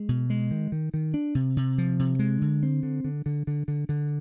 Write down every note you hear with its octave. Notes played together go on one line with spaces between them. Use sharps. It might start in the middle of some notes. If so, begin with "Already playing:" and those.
Already playing: G#3
B2
G#3
D#3
D#3
D#3
D4
C3
C3
F3
C3
G#3
D3
C4
D3
D3
D3
D3
D3
D3